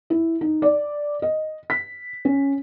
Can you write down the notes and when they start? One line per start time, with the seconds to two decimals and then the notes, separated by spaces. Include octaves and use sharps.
0.10 E4
0.41 D#4
0.62 D5
1.22 D#5
1.70 B6
2.25 C#4